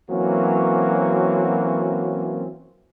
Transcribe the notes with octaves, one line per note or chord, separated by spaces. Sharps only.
E3 F#3 A#3 C4 C#4 F#4